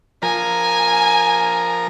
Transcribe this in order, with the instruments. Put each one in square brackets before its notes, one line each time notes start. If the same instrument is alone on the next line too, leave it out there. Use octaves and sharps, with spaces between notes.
[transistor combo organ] F3 A#4 A#5 [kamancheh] G#5